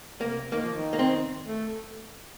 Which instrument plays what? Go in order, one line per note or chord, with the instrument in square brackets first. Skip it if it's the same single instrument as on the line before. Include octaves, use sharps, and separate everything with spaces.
[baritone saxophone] C3 [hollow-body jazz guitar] A#3
[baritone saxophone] D#3 [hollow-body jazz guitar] A#3
[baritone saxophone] F3
D#3
[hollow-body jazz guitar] A#3
C4
[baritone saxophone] A3